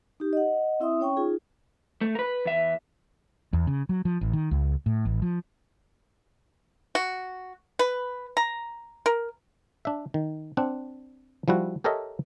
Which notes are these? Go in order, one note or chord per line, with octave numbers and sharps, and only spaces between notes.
D#4 G4
D#5 F#5
C4 E4 E5 C6 D#6
C#4 C#5 G5 C#6
D#4 F4 G#4
A3
A#4 B4
E2 E5
E2
C#3
F#3
F3
A1
D#3
C#2
A2
A1
F3
F#4
B4
A#5
A#4
D4 E5
D#3
C4 D4 F#5
F3 G3 E4 F#4
G4 A4 A#4 C#5 D#5 E5